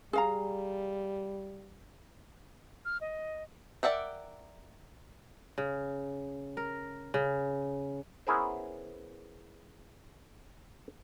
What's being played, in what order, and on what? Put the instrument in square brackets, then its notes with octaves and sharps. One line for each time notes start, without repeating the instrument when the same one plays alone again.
[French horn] G3 [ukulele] G#4 F5 A#5
[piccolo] F6
D#5
[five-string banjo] A#4 D5 E5 F#5 G5
[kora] C#3
A#4
C#3
[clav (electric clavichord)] B3 C#4 E4 G#4 A#4 C5